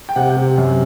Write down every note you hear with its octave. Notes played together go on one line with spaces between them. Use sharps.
G5
C3 F#5
C3
F#2